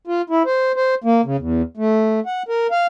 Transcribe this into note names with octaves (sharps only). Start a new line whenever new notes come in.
F4
E4
C5
C5
A#3
C#3
E2
A3
F#5
A#4
F5